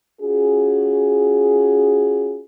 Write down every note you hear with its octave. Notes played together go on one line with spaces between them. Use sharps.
C#4 F4 F#4 G#4